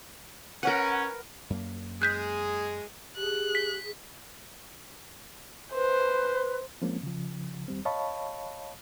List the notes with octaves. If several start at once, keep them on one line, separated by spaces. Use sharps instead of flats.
C#4 A#4 B4 F#5
F#2 A#3
G#3 G#4 F#6 G6 B6
G4 G#4 F#6
B6
B4 C5
F3 G#3 A#3 C4 C#4
C#3 F3
D#2 G3 C4
C#5 D#5 F5 A5 B5 C#6